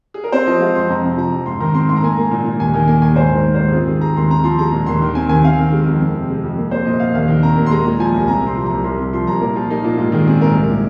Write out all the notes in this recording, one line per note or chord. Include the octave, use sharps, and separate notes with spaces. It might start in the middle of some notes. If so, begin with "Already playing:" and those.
G#4
A#4
C4 C5
F3 D#5
G#3 F5
F2 C6
F2 A#5
C3
F3 A#5
F2
G#2 C6
D#3 A#5
C4 C6
G#2 C6
A#5
A#3 G#5
A#5
A#3
A#2
A#2
D#2 G#5
D#3 G#5
A#3 G#5
D#2 G#5
G#2 C5
D#3
A#4
A#3
C5
G#2
G#4
C4 F4
D#3 G#4
G#3 A#5
D#2 C6
C4 A#5
F3 C6
G#3 A#5
A#2
D#2 C6
D#3
C4 G#5
D#2 G#5
C4 F5
D#3
G#3
F2
C4
C3
G#3
F2
A#3
A#3 C5
A#2 D#5
A#2 F5
D#2 F5
D#3
C4 A#5
D#2
C6
G#3 A#5
A#2
F3 G#5
C2
C4 A#5
C3
C6
F3
C2 A#5
C2 C6
C3
F3 C6
C2 A#5
A#2 A#4
F3 F4
A#3 D#4
A#2 F4
G#2 F4
D#3 G#4
C4 G#4
G#2 A#4
C2
A#2